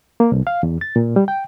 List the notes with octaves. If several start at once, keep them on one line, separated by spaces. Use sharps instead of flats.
A#3
C2
F5
E2
A6
A#2
G3
G5